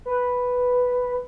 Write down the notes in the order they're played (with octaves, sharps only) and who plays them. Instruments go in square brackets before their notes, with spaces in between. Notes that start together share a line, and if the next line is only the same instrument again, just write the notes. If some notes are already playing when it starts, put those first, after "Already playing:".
[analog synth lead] B4